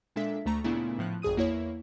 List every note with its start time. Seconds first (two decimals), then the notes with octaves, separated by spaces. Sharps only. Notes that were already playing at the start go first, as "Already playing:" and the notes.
0.16 A#2 G#3 D4 A4 E5 B6
0.45 D2 A3 A#5 C#6
0.64 A#2 C#3 A3 B3 D4 E4
0.98 A2 F3 F#6
1.22 G#1 F2 G#4 D#6 D#7
1.36 E2 A#3 E4 C#5